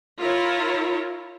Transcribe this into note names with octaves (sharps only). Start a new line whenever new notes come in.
E4 F4 A#4 C#5